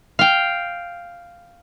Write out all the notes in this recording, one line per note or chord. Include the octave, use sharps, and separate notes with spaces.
F5 G5